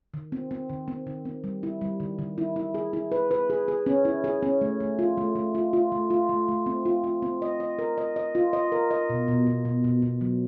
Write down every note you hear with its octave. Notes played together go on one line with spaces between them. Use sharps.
D#3
C4
C4
D#3
C4
D#3
C4
G3
E4
G3
D#3
D#3
E4
E4
G#4
E4
B4
B4
G#4
G#4
C#4
E4
G#4
C#4
A3
A3
F4
A3
A3
F4
F4
A3
F4
A3
A3
C4
F4
F4
C4
D#5
D#5
A#4
D#5
D#5
F4
D#5
A#4
D#5
B2
B2
B2
B2
B2
B2
F#3